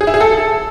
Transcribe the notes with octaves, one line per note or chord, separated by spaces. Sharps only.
G#4
E4
G#4
A4